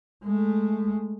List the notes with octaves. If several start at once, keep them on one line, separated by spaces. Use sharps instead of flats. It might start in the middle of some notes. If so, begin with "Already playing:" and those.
G#3 A3